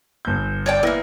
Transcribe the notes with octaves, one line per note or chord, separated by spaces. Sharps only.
G1 G6
C#5 D5 G5
A#3 B3 E4